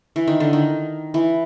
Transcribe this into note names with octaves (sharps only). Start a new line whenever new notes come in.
E3
D#3
D3
D#3
E3